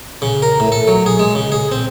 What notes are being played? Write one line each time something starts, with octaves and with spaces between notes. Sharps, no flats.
C#3
A#4
A2
A4
F#3
G#4
G#3
C#3
G#4
C4